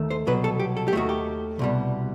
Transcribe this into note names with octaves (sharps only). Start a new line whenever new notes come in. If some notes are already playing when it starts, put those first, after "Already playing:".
Already playing: D#2 D#3 A3
C5
C2 B2 F#3 B4
A4
G4
A4
G4
D#2 D#3 A3 F#4
G4
C2 B2 G3